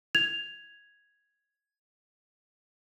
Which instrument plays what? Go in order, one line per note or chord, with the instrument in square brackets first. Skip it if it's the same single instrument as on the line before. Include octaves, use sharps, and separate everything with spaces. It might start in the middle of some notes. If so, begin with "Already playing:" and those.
[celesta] G#6 F7